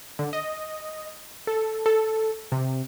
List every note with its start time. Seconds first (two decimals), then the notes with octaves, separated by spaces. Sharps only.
0.19 D3
0.33 D#5
1.47 A4
1.86 A4
2.52 C3